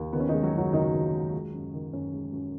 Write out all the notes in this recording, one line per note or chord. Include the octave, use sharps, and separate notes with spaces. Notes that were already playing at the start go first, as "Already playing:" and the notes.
Already playing: D#2
D#3 B3
C#4
D#3 D#4
G#3
F#3 F#4
F#2 F#3 F#4
F#1 D#3 D#4
D#3
G#3
G#3
F#2
D#3
F#2 C#4
G#3
F#2